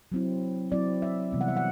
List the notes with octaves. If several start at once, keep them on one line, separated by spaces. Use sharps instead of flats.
F#3 C4 E4
F#3 C4 E4 D5
E5
C3 E3 G3 B3
F#5
E5
F#5